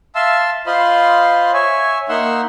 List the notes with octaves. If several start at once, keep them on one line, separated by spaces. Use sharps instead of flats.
E5 F5 A5 C6 E6
F4 C5 D#5 F5 B5 C6
C#5 E5 G#5
A#3 D#4 E5 F#5 C6 E6